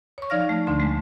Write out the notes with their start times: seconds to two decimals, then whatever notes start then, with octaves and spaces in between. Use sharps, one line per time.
0.18 C#5 C#6
0.30 F3 D#4 D5 F5 F6 A#6
0.49 A3
0.67 D2 D3 D4 C6
0.80 G#3 A3